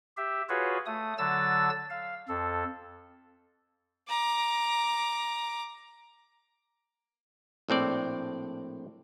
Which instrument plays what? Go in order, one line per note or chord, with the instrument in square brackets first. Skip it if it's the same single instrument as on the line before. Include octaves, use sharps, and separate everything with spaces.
[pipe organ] G4 E5
F4 F#4 G#4 B4 C#5
A3 D#6
D3 F#3 A5 E6 A6
F5
F2 A4
[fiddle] A#5 D6
[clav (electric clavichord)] A#1 A2 C4 D5